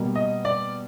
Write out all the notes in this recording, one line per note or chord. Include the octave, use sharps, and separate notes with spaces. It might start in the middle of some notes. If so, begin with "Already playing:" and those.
Already playing: B2 G3 A#3
D#5
D5